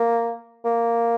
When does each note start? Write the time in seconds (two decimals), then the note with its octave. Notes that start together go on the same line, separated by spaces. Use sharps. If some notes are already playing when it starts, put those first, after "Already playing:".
Already playing: A#3
0.65 A#3